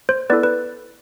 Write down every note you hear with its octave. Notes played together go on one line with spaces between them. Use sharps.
C5
B3 E4 A4 B4 D5
B4